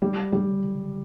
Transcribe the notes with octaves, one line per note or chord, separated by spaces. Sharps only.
G3
G3